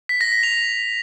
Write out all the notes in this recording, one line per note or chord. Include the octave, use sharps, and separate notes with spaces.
B6
A#6
B6
F7